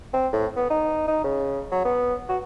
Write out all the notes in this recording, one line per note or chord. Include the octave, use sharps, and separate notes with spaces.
C4
A2
B3
D#4
D#4
C#3
F#3
B3
F#4